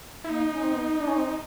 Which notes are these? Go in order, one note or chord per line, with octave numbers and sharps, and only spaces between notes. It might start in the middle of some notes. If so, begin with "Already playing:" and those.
E4
A#3 D#4
C#4
C4
B3
D4
C#4
C4